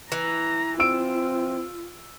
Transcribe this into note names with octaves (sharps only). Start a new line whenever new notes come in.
E3 A#5
C4 F4 E6 D7